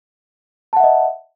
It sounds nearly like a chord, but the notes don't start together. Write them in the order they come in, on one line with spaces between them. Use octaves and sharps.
A5 F#5 E5 D#5